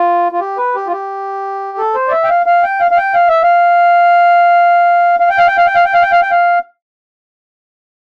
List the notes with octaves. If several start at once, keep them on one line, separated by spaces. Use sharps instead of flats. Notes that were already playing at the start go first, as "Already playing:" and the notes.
Already playing: F4
F4
G4
B4
G4
F4
G4
A4
C5
D5
E5
G5
F5
F5
G5
F5
F5
G5
F5
E5
F5
F5
G5
F5
G5
F5
G5
F5
G5
F5
G5
F5
G5
F5